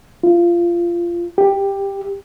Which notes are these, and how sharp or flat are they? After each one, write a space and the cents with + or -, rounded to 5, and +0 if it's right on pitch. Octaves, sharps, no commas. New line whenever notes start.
F4 -20
G4 +10